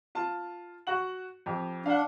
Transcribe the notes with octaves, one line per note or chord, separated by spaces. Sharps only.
F4 A5
F#4 F#5 F#7
F2 G4
D4 F5 F#5